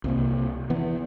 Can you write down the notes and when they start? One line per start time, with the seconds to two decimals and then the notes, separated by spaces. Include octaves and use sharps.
0.04 C2 C3 A#3
0.70 E3 B3